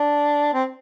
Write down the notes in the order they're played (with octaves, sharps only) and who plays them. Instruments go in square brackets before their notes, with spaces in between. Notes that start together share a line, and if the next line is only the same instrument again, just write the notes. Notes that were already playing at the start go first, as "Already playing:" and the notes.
Already playing: [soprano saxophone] D4
C4